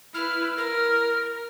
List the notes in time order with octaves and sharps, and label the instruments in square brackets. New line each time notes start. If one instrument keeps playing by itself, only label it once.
[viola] E4 B4 [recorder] F6
[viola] A#4 [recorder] F6